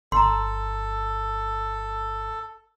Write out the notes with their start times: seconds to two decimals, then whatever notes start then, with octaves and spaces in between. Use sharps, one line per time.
0.12 G1 A4 A#5 C6